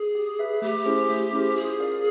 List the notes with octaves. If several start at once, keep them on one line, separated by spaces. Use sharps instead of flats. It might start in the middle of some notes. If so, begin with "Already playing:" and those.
Already playing: G#4
G4
B4 E5
A3 G4
C#4 E4 G#4 C5
A3
C#4 E4 G#4 C5
F4 G#4
A#4 D5 F5